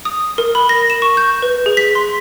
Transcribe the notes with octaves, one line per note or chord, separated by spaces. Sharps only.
D#6
A#4
B5
A#6
E7
C#6
G6
B4
G#4
B6
C6